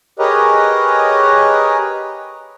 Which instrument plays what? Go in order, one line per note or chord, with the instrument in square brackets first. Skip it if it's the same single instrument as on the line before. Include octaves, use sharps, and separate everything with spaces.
[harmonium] G4 G#4 A#4 B4 C#5 D#5